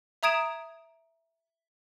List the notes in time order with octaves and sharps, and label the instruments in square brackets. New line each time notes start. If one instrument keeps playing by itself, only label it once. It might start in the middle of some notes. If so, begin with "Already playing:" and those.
[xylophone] E5 A#5 D#6 G#6 D7 E7